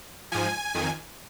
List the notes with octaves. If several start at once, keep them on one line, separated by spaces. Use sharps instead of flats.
G#2 F3 G#5
F2 D#3